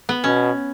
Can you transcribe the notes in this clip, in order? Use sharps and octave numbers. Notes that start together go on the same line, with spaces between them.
B3
B2 C#4